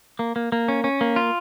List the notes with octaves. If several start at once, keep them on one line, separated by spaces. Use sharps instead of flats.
A#3
A#3
A#3
C#4
C#4
A#3
F4